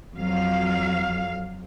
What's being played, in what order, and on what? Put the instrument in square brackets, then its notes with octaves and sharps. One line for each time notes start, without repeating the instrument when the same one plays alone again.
[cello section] F2 F#3 F5